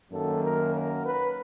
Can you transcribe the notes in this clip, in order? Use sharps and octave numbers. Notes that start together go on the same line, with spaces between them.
F#2 D#3 F#3 A#3 A4
A#4
A#4
B4